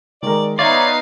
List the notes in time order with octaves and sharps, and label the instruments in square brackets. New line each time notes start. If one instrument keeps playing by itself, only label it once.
[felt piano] D#3 G#3 A#4 [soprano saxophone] D5
[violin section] B3 D#4 C6 [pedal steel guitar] C#5 D5 [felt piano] E5 A#6 [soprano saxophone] F5